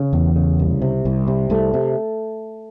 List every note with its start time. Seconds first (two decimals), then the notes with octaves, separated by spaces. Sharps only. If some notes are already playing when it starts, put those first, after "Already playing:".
Already playing: C#3
0.13 E2
0.36 C#3
0.59 C2
0.82 C3
1.05 C2
1.28 C3
1.50 C2 A3
1.74 C3